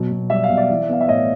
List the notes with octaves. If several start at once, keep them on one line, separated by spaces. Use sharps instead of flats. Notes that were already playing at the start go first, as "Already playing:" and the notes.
Already playing: B2 F#3
B2
G3 E5
F5
B2
D5 E5
E3
B3 F5
E5
A2 C#5 D#5